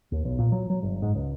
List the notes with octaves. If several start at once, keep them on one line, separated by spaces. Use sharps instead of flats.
D#2
B1
A#2
F#3
F#3
G1
G#2
C#2